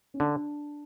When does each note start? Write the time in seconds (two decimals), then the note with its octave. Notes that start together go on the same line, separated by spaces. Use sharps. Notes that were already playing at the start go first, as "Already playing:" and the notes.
0.14 C#4
0.20 D3 D4